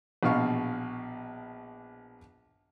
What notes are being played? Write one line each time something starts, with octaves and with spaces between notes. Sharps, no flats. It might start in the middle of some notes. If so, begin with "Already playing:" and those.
A#1 B2 F5 C#6